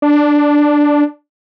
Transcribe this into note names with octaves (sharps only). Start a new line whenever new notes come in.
D4